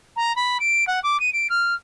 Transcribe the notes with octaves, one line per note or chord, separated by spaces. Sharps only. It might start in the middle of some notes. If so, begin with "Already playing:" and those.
A#5
B5
D7
F#5
D6
D#7
D7
F6